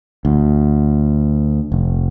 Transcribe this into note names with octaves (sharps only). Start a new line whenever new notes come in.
D2
F1